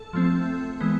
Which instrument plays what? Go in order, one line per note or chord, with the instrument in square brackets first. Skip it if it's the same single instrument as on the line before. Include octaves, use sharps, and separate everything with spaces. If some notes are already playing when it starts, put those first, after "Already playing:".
Already playing: [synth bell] A4
F3 A3 C4
E3 G#3 B3